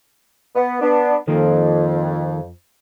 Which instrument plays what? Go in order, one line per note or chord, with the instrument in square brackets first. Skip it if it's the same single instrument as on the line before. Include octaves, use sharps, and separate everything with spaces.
[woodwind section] B3
B3 D4
[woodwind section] F2 [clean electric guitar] D#3 F3 A#3